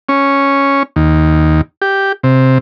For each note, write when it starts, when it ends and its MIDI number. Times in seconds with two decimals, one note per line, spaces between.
0.09 0.83 61
0.96 1.61 39
1.82 2.12 67
2.24 2.58 48